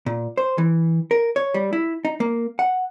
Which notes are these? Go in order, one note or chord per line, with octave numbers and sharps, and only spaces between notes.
A#2
C5
E3
A#4
C#5
G3
E4
D#4
A#3
F#5